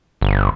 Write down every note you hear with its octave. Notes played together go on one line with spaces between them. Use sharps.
G1